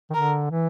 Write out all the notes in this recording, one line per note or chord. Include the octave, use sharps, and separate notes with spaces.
D#3
D3 A#4
E3